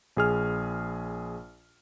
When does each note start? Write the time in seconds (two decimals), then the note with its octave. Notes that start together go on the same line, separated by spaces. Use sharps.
0.17 A#1 G#4 F6